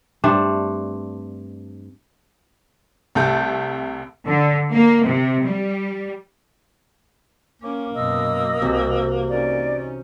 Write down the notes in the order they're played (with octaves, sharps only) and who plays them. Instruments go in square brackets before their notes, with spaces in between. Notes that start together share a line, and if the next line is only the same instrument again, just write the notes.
[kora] G2 A3 C4 D4
[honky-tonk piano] C2 C3 A3 A5 G6
[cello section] D3
A#3
C3
G3
[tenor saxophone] A#3 [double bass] C#4 [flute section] D6
[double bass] F#2 B2 [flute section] D#5 D#6 E6
[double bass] C2 [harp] C3 E3 F#4
[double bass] C#4 D#4 [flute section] D5